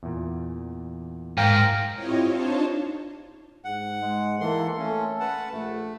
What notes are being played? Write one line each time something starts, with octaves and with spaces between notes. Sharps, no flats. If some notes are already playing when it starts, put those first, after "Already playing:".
E2 A#2
G#2 A#4 F5 G5
C4 E4 F4 G4 C#5 D#5
D4 D#4 F4 C5 C#5 A5
G#2 F#5
G#3
E3 A#3 A4 C6
A3 C#4
B4 F#5 A5
A#1 A3